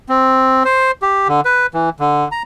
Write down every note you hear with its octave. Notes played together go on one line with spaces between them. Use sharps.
C4
C5
G4
D3
B4
E3
D3
A#5